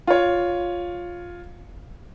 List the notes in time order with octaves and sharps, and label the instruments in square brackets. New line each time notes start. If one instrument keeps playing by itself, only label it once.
[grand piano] F4 C#5